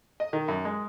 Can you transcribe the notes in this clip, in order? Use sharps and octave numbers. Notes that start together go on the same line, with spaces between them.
D#5
D#3
F#2
G#3